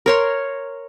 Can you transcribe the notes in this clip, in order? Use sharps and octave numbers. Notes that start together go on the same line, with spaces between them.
A#4 C#5 C6